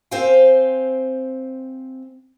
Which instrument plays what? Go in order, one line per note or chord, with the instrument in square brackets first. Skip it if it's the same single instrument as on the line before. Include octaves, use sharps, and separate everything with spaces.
[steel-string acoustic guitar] C4 C5 F5 G5 G#5